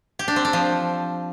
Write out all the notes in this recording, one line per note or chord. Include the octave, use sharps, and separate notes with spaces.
G4
D4
C4
D4
F3